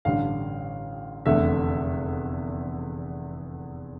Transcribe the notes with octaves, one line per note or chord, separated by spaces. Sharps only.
A1 G2 D3 F5
F1 E2 D3 A3 E5